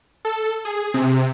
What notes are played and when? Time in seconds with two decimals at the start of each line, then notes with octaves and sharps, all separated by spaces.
0.25 A4
0.65 G#4
0.94 C3